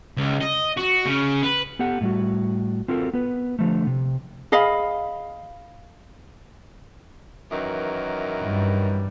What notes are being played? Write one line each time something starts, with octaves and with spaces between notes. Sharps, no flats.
C#2
D#5
F#4
C#3
B4
B3 G4 A4 F#5
A2 G3 F#4
C4 F4 F#4 A4 A#4
B3 B4
D3 F3 A3
C3
G#4 D#5 F5 B5
F#2 D#3 E3
G2 G3